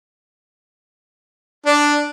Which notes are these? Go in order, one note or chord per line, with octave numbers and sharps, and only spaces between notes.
D4